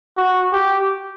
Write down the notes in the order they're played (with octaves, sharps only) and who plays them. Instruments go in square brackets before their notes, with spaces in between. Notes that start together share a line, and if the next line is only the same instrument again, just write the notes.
[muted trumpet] F#4
G4